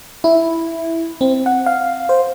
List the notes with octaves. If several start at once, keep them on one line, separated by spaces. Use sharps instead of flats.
E4
C4
F#5
F5
C5